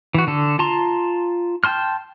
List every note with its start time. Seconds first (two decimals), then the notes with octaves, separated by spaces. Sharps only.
0.14 E3 F#4
0.27 D3 A4
0.59 F4 A5 A#5 C6
1.64 G5 A5 C6 F6